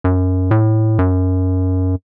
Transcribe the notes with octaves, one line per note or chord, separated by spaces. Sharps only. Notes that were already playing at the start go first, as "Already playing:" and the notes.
F#2
A2
F#2